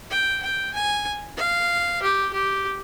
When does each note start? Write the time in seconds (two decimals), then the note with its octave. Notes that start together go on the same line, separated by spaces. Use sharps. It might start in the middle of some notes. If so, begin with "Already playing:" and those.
0.11 G5
0.42 G5
0.74 G#5
1.37 F5
2.02 G4
2.33 G4